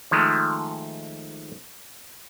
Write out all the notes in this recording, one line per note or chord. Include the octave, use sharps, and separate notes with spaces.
D#3 F3 G#3 A3